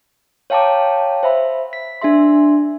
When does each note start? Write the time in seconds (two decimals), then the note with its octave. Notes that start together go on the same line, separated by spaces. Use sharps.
0.50 C#5 F5 G5 A5 A#5 D6
1.23 C5 E5 B5
1.73 B6
2.01 D4 G#4 E5 C6